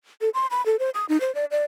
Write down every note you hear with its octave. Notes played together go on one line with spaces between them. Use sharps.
A4
C6
B5
A4
C5
D#6
D#4
C5
D5
D5